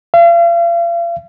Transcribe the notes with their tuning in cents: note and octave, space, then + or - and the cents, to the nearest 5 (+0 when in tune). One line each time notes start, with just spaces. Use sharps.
F5 -40